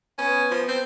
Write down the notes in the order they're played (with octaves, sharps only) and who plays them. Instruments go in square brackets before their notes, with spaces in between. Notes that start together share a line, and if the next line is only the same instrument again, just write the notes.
[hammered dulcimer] B3 [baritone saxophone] C#4
[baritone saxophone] F3
C4